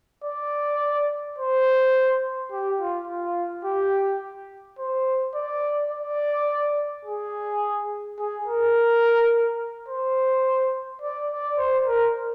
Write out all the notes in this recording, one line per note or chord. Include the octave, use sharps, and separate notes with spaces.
D5
C5
G4
F4
F4
G4
C5
D5
D5
G#4
G#4
A#4
C5
D5
D5
C5
A#4